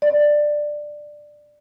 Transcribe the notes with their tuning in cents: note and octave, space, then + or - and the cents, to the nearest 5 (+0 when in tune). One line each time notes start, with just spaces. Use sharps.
D5 +10